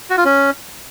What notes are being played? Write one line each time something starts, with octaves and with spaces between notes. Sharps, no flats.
F#4
F4
C#4